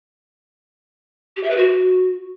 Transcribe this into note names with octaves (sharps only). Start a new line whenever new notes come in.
G4
E5
B4
F#4